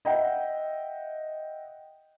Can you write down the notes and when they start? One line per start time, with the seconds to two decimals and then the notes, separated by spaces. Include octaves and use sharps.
0.05 D#5 E5 F#5 G5